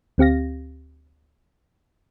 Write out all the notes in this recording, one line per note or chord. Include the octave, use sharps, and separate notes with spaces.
D2 C4 G4 F5 A#6